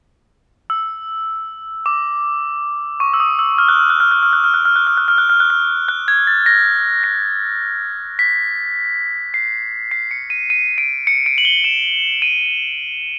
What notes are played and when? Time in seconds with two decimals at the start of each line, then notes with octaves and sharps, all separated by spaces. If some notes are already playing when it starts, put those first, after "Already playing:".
0.70 E6
1.86 D6
3.00 C#6
3.14 E6
3.20 D#6
3.39 E6
3.58 F6
3.68 F#6
3.79 F6
3.90 F#6
4.00 F6
4.11 F#6
4.23 F6
4.33 F#6
4.44 F6
4.54 F#6
4.65 F6
4.76 F#6
4.87 F6
4.97 F#6
5.08 F6
5.18 F#6
5.29 F6
5.40 F#6
5.50 F6
5.89 F#6
6.08 G#6
6.27 A6
6.46 A#6
7.04 A#6
8.19 B6
9.34 C7
9.91 C7
10.11 C#7
10.30 D#7
10.50 D#7
10.78 D7
11.07 C#7
11.26 D7
11.38 F#7
11.45 G7
11.64 E7
12.22 D#7